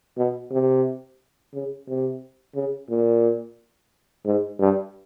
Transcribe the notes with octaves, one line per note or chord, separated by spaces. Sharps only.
B2
C3
C#3
C3
C#3
A#2
G#2
G2